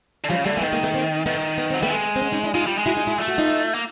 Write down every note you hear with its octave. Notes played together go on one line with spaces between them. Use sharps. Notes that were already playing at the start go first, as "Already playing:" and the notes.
D3
C#3 F3 G3
D3 G3 A3
E3 A#3
D#3 A3 B3
G#3 A#3
A3 B3
A#3 C4
D#3 A3 B3
B3
F#3 C4
G3 A3 B3
G#3
C4
B3 C#4
C#4 D#4
D4 E4
G#3 D#4 F4
G3
G#3
E4 F#4
D#4 F4
E4 F#4
A3 F4
F#4
D#4 F4
A#3